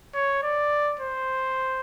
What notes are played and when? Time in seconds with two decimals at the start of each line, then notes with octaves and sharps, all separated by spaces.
0.15 C#5
0.43 D5
1.00 C5